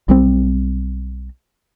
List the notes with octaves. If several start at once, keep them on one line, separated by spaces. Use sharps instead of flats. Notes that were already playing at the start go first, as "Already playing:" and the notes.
B1 G3 C4